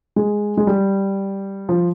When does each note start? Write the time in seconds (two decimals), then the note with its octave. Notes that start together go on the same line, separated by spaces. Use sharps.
0.16 G#3
0.57 G#3
0.67 G3
1.69 F3